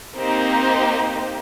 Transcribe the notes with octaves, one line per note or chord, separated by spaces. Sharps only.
A#3 C4 D#4 G4 C5